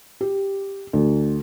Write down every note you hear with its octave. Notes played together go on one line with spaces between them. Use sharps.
G4
D2